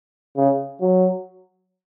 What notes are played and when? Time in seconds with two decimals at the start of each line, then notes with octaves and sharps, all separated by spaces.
0.37 C#3
0.81 F#3